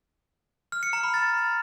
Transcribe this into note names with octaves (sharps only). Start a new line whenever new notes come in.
F6
C#7
A#5
B5
A6